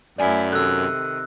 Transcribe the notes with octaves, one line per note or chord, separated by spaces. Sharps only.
F#2 A3 E4 D5 G#5
C3 D#3 A4 E6 F#6